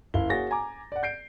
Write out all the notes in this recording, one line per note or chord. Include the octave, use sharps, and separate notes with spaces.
F#1 E4 F5 G7
A#3 F#4 G#4 C#5 A6 A#6
G#5 A#5 D6
D5 F#5
G6 C7 D7